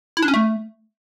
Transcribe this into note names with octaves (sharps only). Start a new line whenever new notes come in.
E4
D4
C#4
A3